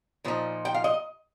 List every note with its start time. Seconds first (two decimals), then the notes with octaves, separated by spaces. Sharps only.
0.24 A#2 F3 D#4
0.65 G5
0.74 F5
0.84 D#5